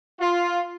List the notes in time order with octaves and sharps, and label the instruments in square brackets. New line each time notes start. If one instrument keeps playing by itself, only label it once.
[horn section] F4